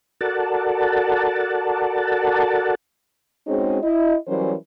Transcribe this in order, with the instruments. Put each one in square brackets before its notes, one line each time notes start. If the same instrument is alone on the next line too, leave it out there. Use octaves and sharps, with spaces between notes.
[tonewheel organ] F#4 A4 A#4 D5 F#5 A5
[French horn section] G#3 C4 C#4 D#4 F#4 G#4
E4 D#5
E3 F#3 G3 C#4 A#4 C5